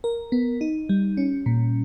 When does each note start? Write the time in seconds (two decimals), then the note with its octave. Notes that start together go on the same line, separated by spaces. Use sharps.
0.04 A#4
0.32 B3
0.61 D#4
0.89 G3
1.17 C#4
1.46 A#2